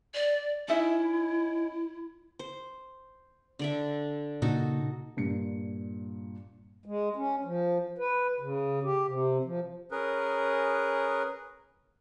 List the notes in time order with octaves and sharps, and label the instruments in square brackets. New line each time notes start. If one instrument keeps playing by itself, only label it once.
[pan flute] D5
[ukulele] C#4 D#4 E5 [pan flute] E4
[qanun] C5
D3 D5 E5
[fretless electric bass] A#2 C#3 [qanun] D#4 F#4 A4
[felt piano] G2 A#2 C#7
[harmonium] G#3
C#4
F3
B4
C#3
G4
C3
F3
[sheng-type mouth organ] C#4 G#4 A#4 B4